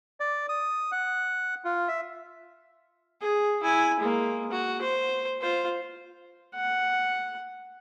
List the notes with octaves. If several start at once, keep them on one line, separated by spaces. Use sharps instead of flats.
D5
D#6
F#5
F4
E5
G#4
E4 G#5
G#3 A#3
F#4
C5
F4 C5
F#5